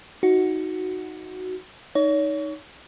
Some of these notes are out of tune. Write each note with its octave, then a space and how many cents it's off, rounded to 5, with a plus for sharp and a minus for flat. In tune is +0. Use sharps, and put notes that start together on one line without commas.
D#4 +15 F#4 +0
D#4 +0 C#5 +35